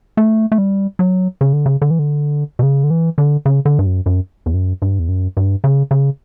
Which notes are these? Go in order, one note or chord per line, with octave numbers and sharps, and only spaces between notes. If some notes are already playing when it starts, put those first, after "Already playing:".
A3
A3
G3
F#3
C#3
D3
C#3
D3
E3
D3
B2
C#3
D3
E3
D3
C#3
D3
G2
F#2
F#2
E2
F#2
G2
E2
F#2
G2
C#3
C#3